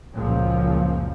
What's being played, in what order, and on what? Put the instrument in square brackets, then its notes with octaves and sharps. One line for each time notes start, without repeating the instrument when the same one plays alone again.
[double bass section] F#1 C#2 F#2 A#2 F3